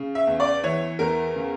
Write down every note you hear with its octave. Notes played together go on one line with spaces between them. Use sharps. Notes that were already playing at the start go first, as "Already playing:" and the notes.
Already playing: C#3
E5
E2
D5
E3 C#5
E2 A#4
C#3